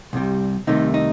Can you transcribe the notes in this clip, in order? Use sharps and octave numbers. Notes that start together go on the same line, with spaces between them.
C2 C3 G3
C2 C3 D#3 A3 D#4
D#4